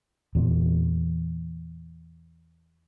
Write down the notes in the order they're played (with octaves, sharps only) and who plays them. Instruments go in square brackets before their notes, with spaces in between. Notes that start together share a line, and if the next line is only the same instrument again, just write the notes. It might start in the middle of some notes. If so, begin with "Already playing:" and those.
[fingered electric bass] E2 A#2